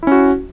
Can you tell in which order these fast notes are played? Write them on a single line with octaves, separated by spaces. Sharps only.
E4 C#4 F#4